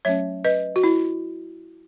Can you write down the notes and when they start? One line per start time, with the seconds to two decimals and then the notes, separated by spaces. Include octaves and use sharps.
0.05 F#3 A3 C#4 C#5 E5
0.44 B4 D#5
0.76 F#4
0.84 E4